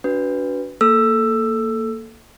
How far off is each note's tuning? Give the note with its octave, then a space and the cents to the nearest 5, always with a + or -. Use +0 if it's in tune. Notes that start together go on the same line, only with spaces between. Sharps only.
D4 -30 F#4 +10 B4 +0
A#3 -15 A4 -10 E6 +15